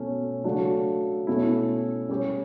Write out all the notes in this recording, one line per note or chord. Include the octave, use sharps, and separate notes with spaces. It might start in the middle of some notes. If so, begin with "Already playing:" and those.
Already playing: B2 A3 C#4
C#3 F#3 A3 D4 F#4
B2 A3 C#4 E4
G3 C#4 G4